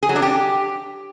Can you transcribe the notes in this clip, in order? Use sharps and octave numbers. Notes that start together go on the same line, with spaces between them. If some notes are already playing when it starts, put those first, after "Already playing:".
G#4
F#3
D4
G4